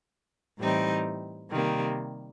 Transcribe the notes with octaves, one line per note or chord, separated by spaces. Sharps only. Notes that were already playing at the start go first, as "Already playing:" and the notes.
A2 E3 G3 C4 D#4
C3 D#3 G3 A#3